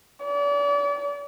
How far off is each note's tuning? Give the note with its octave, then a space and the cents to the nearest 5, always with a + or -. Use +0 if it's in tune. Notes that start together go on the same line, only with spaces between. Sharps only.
D5 -40